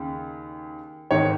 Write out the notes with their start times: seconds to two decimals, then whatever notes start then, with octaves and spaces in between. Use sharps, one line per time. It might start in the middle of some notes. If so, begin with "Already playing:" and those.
Already playing: D#2 C#3
1.11 G#1 G#2 D#3 C#5